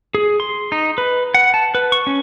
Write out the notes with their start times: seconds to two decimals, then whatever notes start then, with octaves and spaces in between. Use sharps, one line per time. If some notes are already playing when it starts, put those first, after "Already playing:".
0.15 G#4
0.40 C6
0.72 D#4
0.98 B4
1.34 F#5
1.54 A5
1.75 B4
1.92 C#6
2.07 C#4